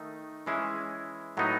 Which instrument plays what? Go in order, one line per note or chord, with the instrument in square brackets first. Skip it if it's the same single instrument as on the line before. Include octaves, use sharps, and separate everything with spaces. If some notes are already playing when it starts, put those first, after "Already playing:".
Already playing: [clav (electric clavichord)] D#3 A3 D#4
E3 G#3 C#4 E4
A2 F#3 B3 D#4